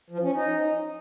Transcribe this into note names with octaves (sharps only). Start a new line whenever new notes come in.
F3
C#4
D#4